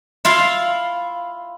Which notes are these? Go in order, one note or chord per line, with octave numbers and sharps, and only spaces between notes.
E4 F4 F5